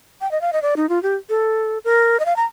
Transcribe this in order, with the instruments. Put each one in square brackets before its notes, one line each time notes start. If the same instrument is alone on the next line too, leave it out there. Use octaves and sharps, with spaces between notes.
[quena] G5
D#5
F5
D#5
D5
D#4
F4
G4
A4
A#4
D#5
F5
A#5